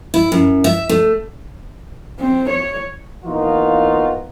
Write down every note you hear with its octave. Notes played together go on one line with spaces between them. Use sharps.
E4
F#2
E5
A3
C4
C#5
E3 A#3 B3 D#4 F4 F#4